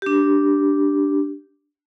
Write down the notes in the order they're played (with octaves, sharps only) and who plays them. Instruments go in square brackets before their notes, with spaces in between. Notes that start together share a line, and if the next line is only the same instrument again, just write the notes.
[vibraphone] D4 G4